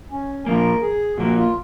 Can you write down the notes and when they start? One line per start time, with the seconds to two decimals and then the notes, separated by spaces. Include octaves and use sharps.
0.11 C#4
0.46 A#2 F3 A#3 A#4
0.81 G#4
1.17 A#2 F3 A#3 F#4
1.36 F4